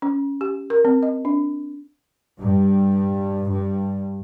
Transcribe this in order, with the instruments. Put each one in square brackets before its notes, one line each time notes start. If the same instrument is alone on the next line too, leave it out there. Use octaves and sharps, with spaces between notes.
[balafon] C#4
G4
A#4
C4
D#5
D4
[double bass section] G2
G2